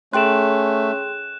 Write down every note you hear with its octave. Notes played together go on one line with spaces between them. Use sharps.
A3 C#4 G#4 G5 C6 F#6 E7